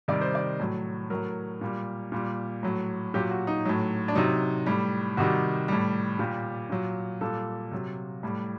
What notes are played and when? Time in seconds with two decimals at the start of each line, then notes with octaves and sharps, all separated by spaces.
0.08 C3 D#3 G3 D5
0.21 C5
0.35 D5
0.60 A2 F#3
1.10 A2 F#3 A#4
1.61 A#2 G3
2.12 A#2 G3
2.63 A2 F#3
3.14 A#2 F#3 G4
3.31 F#4
3.47 D#4
3.65 A2 F#3
4.08 D4
4.15 C3 F#3 D#4
4.66 A2 G3
5.17 C3 D#3 G3 F#4
5.68 A2 G3
6.19 A#2 G3 G4
6.70 A#2 F#3
7.21 A#2 G3 A4
7.72 C3 F#3
8.23 A2 G3